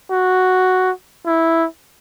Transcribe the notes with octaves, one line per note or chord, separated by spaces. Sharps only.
F#4
E4